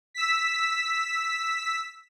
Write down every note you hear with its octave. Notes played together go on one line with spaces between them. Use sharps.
E6 B6